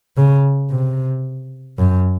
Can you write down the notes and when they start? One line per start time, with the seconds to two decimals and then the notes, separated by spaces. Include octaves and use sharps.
0.17 C#3
0.70 C3
1.78 F#2